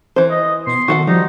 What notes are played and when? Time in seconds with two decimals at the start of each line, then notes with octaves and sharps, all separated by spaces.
0.16 E3 C5
0.30 D#5
0.67 B2 C6
0.88 D#3 F#4 A4 F#5
1.07 F3 G3 D#4